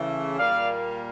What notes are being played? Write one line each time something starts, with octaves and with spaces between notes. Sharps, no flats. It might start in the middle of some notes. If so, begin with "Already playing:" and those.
Already playing: C#3 E3 A3
A#2 G3 A#3 D5 F5